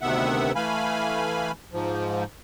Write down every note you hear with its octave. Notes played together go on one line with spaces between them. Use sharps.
D2 C3 D#3 B3 E5 F#5
E3 A3 F5 G#5 B5
G#2 F3